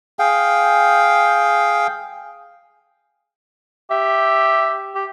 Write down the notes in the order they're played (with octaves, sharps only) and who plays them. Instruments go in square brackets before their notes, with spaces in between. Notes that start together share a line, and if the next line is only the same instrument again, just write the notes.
[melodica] G#4 F5 G5
[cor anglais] G4 [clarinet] E5
[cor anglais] G4